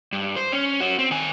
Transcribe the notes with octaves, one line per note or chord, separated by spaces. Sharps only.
G2
C5
C#4
C#4 F#4
C4
D#3 G#5